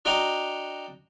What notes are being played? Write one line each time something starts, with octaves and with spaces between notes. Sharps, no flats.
D4 F#4 D#5 G5 A#5